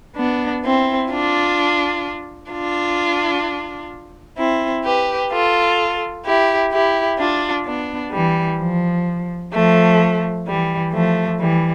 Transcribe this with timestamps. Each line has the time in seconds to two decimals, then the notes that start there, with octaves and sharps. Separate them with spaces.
0.17 B3 D4
0.64 C4 E4
1.10 D4 F4
2.51 D4 F4
4.38 C4 E4
4.84 G4 B4
5.32 F4 A4
6.25 E4 G4
6.72 E4 G4
7.19 D4 F4
7.66 B3 D4
8.12 E3 G3
8.59 F3
9.53 F3 A3
10.46 E3 G3
10.93 F3 A3
11.40 E3 G3